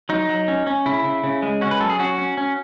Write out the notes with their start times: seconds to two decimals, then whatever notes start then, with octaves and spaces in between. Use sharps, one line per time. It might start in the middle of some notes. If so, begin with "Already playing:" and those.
0.09 F#3 D#4
0.29 F#3
0.48 C#4
0.67 C#4
0.86 C#3 E4
1.04 C#3
1.24 C#3
1.42 G#3
1.61 C#4 F#4
1.71 B4
1.80 F#3 A4
1.90 G#4
1.99 C#4 F#4
2.18 C#4
2.37 C#4